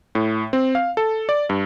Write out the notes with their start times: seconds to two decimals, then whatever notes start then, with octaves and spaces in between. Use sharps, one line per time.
0.15 A2
0.53 C4
0.75 F5
0.97 A4
1.29 D5
1.49 G2